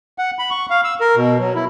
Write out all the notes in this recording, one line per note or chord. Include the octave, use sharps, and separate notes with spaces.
F#5
B5
C#6
F5
E6
A#4
B2
F#3
E4